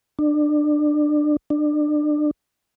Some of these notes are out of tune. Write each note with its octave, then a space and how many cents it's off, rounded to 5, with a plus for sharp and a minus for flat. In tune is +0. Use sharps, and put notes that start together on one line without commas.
D4 +25
D4 +30